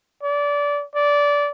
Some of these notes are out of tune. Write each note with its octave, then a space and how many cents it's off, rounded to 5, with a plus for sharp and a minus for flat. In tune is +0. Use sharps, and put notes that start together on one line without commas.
D5 -25
D5 -20